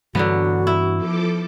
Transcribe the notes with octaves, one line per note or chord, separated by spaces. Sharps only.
G2 D3 E3 F#3 G3 B3 F#4
E4
F3 A4 D6